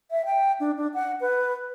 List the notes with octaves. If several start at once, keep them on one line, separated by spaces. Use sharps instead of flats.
E5
G5
D4
D4
F#5
B4